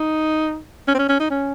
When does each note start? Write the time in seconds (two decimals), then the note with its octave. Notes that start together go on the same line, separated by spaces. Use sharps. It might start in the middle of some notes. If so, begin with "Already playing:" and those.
Already playing: D#4
0.88 C#4
0.95 C4
0.99 C#4
1.09 C#4
1.20 D#4
1.31 C#4